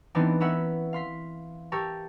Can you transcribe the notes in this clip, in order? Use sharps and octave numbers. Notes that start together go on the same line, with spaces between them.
E3 B3 C4 D4 D#4
B3 C#4 A#4 E5 F#5
F5 C6 B6
G4 A4 A#4 C#6